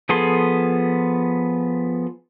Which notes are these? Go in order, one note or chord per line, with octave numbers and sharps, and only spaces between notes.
F3 B3 G#4 A4 C6